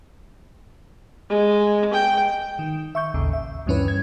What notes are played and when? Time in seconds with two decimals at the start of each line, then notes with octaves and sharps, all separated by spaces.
1.30 G#3
1.93 G5
2.59 D#3
2.95 E5 C#6 G6
3.14 A1 D#2 C#3
3.33 E5
3.66 D2 G2 E3 C#4 E4 B4
3.88 G#6